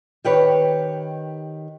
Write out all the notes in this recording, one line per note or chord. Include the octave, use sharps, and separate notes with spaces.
D#3 G4 B4 C#5